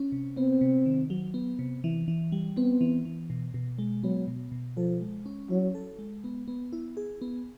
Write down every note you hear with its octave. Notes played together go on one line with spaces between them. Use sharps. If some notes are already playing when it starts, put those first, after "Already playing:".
Already playing: C#4
C3
B3 C4
C3
D#3
F#3
B3
C3
E3
E3
G3
B3 C4
E3
E3
B2
B2
G#3
F#3 B3
B2
B2
F3 A4
G#3
C#4
F#3 E4
A4
G#3
B3
B3
E4
G#4
B3